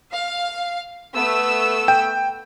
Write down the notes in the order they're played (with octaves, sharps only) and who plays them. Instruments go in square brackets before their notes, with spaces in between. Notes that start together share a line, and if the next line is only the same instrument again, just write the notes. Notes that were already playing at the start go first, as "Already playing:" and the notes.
[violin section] F5
A3 B3 E6
[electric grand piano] G5